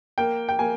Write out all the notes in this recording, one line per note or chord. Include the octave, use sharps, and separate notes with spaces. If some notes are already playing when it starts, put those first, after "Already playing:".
A#3 G5
G5
A#3 G#5